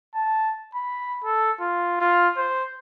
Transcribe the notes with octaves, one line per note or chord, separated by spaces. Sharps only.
A5
B5
A4
F4
F4
C5